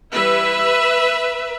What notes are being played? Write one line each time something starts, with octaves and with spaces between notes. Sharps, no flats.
E3 G3 E4 B4 E5